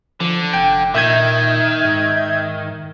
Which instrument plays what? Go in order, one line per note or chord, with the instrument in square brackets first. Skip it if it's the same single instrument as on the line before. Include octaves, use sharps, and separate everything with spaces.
[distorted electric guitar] D3 [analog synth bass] F3
[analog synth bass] F1 [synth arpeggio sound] G5
[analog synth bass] A#2 [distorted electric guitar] D#3 [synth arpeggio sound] E5 G6 G#6
[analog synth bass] G#2